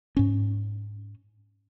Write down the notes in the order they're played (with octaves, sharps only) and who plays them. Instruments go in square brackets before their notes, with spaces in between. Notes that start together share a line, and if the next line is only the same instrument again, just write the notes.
[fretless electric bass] G#2 C#4